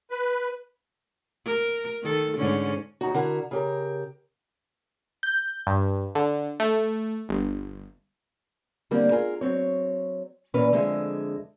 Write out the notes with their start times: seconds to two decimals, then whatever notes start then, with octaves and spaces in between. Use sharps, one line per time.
0.11 B4
1.45 A#4
2.03 D#3 A4
2.37 G#2 D3 C#4
3.01 D#2 D#4 F#4
3.14 D3 E4 F#4 A#4 A#5
3.51 C#3 G4 A#4
5.23 G6
5.67 G2
6.15 D3
6.60 A3
7.29 G1
8.91 D3 G3 A#3 C4
9.11 F4 G#4 A#4
9.41 F#3 C4 C#5
10.54 A#2 E3 C#4 B4
10.73 F2 D3 G#3 G#4 D#5 E5